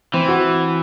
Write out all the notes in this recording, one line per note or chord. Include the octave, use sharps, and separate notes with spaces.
E3 C4
F#4